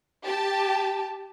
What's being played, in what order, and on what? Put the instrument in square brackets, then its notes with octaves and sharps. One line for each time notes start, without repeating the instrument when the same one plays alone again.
[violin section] G4 A5